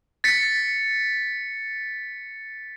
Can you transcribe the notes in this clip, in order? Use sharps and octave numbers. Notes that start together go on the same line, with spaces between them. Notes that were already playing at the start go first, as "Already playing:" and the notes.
A6 B6 C#7